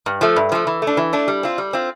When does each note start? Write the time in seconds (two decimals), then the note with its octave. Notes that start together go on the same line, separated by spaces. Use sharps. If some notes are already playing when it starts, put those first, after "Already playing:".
0.06 G2
0.21 F3 A3
0.36 G2
0.52 F3 A3
0.67 E3
0.82 A3
0.87 D4
0.97 E3
1.13 A3 D4
1.28 G3
1.43 C4 F4
1.58 G3
1.73 C4 F4